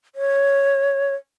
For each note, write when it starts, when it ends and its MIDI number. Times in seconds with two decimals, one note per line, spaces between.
0.15 1.14 73